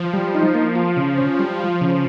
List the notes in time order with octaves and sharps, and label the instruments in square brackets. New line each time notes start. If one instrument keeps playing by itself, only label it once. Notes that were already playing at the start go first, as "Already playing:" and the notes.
Already playing: [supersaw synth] F3
[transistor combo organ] G3
D#4
A#3
[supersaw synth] F3 [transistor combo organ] F4
[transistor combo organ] C#3
C#4
G3
F4
C#3